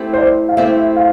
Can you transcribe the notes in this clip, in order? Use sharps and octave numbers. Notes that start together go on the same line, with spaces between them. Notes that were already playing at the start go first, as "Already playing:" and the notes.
Already playing: A3 C4 E4 G4
C5
D5
F5
A3 C4 E4 G4 E5
E5
F5